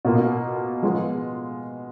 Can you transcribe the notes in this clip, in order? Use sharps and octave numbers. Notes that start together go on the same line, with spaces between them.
B2 A#3 F4
F3 G#3 B3 F4